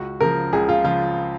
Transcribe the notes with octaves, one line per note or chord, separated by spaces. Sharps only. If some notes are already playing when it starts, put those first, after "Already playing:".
Already playing: C#2 F#4
C#3 F3 A#4
C#2 G#4
F4
C#3 F3 F4